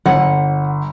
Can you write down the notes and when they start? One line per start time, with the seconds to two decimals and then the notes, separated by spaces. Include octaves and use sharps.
0.06 G1 F#5